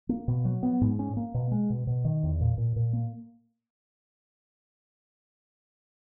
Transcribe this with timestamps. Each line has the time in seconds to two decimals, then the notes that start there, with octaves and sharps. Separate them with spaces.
0.09 A#3
0.28 B2
0.45 F#3
0.63 B3
0.81 G#2
0.99 C#4
1.17 A#3
1.34 B2
1.52 G#3
1.70 B2
1.87 B2
2.05 D#3
2.23 E2
2.41 A#2
2.58 A#2
2.76 A#2
2.93 A#3